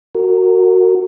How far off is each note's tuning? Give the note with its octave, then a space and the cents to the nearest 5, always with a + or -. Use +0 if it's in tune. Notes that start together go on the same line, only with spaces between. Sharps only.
F#4 +0 A#4 -25